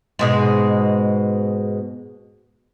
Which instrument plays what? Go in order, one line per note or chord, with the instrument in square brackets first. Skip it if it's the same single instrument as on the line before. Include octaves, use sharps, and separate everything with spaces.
[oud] G#2 B2 G#3